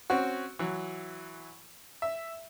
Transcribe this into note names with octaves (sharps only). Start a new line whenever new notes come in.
C4 C#4 F#4
E3 F#3
E5